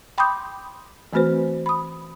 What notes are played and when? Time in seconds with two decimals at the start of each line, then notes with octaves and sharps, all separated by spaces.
0.18 G5 B5 C6 D6 D#6 G6
1.13 E3 A3 C4 F#4 B4 C5
1.66 B5 D#6